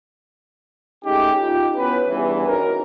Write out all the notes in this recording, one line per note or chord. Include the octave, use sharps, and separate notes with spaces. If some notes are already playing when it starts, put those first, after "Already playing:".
G#3 A3 C#4 D#4 G4
D#4 F4 G4
B3 C#4 E4 B4
E2 G2 E3
C#4 D#4 F#4 A#4